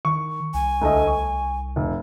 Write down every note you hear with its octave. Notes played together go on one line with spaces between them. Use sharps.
D#3 C#6
C2 G#5
D2 A3 D#5
C#6
F1